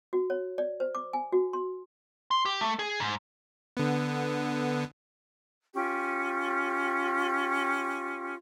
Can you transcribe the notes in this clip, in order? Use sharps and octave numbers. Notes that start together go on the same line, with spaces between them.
F#4
C#5
D5
C5
D6
G#5
F#4
C6
C6
G4
A3
G#4
G#2
D3 B3
C#4 F4 G4